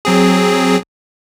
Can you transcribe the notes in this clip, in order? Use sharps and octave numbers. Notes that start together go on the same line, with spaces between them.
F#3 C4 G#4